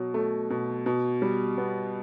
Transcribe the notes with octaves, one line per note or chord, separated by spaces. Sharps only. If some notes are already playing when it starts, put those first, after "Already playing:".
Already playing: B2 F#3
A3
B2
B2
G3
B3